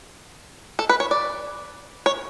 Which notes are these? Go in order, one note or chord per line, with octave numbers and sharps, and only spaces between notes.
A4
B4
C#5
D5
C#5